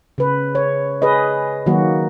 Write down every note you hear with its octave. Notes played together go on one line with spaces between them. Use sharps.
C#3 B4
C#5
G#4 B4 D#5
D#3 F#3 A#3 F#4